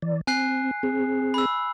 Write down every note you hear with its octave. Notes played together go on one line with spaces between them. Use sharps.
E3 D5
C4 G#5 F#6 C7
C4 G#4
B5 E6